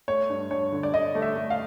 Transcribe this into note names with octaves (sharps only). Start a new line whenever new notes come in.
A3 C#5
G2
G2 C#5
D3
D5
D3 D#5
A3
E5
A3
F5